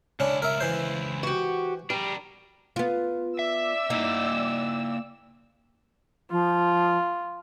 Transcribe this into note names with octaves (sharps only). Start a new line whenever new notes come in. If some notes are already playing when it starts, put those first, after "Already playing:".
C#2 C#4 D4 E4
A#4 E5
E3 C5
F#4 G4
G3 D4 A#4
B3 F4
D5 E5 E6
A#3 D#4 E4 E5
F3 F4